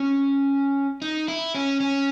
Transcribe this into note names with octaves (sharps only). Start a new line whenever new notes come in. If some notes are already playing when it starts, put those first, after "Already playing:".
Already playing: C#4
D#4
E4
C#4
C#4